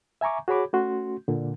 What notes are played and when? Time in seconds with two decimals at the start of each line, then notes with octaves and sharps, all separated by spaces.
0.21 E5 G#5 A#5 C#6 D6
0.48 F#4 G#4 C#5 B5 D6
0.73 A3 C#4 F#4 C6
1.28 A#2 D3